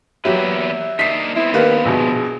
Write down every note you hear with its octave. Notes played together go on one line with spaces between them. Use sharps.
E2 F#3 A#3 G4 B4 E5
A#3 D4 D#4 B6 C7
B3 C4 E4
D#3 A#3 G4 B4
A#1 B2 G#4